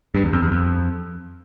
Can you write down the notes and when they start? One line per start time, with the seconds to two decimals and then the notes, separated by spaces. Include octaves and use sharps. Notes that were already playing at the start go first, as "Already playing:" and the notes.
0.15 G2
0.24 E2
0.33 F2
0.42 E2
0.52 F2